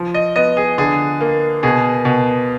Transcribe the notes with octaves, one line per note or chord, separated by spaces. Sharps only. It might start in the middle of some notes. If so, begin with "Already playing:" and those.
Already playing: F3
D#5
B3 D#5
G#4
D3 G#4
A#3
B2 G#4
B2